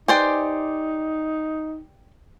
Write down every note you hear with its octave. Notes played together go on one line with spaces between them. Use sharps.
D#4 G4 B4 C5 D5 G5 G#5